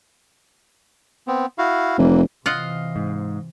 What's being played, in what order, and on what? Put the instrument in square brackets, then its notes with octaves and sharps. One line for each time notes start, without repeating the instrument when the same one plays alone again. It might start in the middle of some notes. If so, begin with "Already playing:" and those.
[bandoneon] B3 C4
E4 F#4 F5
[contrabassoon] F1 [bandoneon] E3 A#3
[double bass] C3 E3 [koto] F4 F#5 [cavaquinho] D#5 F5
[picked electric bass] G#2